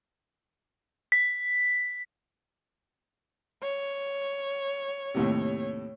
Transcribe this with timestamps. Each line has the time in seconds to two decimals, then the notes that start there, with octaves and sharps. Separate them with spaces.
1.12 B6
3.62 C#5
5.14 D#2 A2 C3